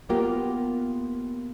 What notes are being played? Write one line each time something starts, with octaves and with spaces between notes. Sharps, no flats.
A#3 B3 F4 G4 A#4 B4